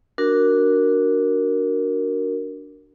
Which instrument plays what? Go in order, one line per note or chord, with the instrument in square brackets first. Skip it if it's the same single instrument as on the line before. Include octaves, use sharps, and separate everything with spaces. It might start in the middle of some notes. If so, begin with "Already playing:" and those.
[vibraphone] D4 F#4 A#4